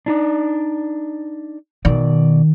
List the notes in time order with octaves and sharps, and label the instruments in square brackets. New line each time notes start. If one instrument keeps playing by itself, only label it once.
[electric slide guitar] D4 D#4 D5
[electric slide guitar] B2 D5 [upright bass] D#3